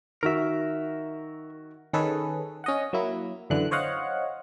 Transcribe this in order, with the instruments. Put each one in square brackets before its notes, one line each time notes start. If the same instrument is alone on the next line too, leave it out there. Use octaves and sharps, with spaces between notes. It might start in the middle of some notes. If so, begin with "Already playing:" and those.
[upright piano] D#3 F#4 [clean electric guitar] A#4 E5
[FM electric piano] D#3 C#4 G#4 A4 B4
C#4 D#5 F#5
F#3 A#3 E4
F#2 D3 E3 F#6
C5 C#5 D#5 F5 F#5